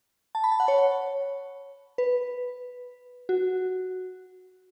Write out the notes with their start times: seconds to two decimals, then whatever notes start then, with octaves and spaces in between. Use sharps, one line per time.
0.35 A5
0.44 B5
0.52 A5
0.60 F#5
0.68 C#5
1.98 B4
3.29 F#4